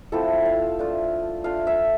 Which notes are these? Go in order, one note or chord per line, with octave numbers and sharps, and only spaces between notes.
F3 C4 E4 A4
F5
A3 D4 F4
A3 D4 F4 F5
E5